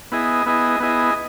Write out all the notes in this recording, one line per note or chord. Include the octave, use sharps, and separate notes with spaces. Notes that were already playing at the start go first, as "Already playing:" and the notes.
B3 E4 G#4 D#5
B3 E4 G#4 D#5
B3 E4 G#4 D#5